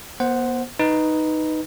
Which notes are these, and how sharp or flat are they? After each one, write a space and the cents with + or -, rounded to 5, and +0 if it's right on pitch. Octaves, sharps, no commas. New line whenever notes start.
B3 -40 C5 +0 F#5 +0
D#4 +0 B4 +0